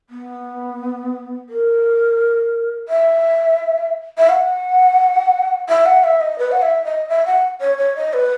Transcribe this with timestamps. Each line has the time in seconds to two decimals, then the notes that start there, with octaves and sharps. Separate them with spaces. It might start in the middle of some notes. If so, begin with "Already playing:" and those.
0.10 B3
1.49 A#4
2.88 E5
4.18 E5
4.29 F#5
5.69 E5
5.86 F#5
6.04 E5
6.21 D#5
6.39 B4
6.51 F#5
6.62 E5
6.85 D#5
7.09 E5
7.26 F#5
7.61 C#5
7.78 C#5
7.96 D#5
8.13 B4